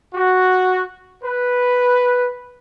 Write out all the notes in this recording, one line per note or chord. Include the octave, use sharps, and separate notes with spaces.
F#4
B4